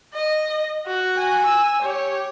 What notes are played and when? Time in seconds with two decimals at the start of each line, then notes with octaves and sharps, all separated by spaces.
0.14 D#5
0.87 F#4
1.17 G#5
1.46 E6
1.82 G4 C#5